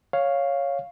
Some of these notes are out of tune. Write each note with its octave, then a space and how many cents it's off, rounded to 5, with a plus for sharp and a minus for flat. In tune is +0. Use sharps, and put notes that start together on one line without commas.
C#5 +0 F5 +0